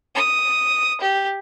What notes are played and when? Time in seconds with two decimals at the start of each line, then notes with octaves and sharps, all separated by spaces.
0.15 D#6
1.01 G4